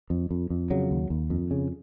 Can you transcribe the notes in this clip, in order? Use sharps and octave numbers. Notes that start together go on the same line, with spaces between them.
F2
F2
F2
C#3 F#3
D#2
D#2
F2
C#3